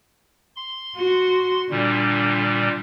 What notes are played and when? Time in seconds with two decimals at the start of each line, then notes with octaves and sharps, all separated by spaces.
0.56 C6
0.96 F#4
1.70 A#2 D3 G3